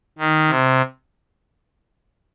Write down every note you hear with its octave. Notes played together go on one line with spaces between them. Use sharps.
D#3
C3